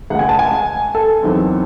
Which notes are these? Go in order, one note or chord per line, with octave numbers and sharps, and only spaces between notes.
C#2 C#3 G#3 F#5
G#5
A5
G#5
A4
E2 D#3 F#3 C4